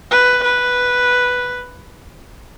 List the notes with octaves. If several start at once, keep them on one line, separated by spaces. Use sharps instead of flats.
B4
B4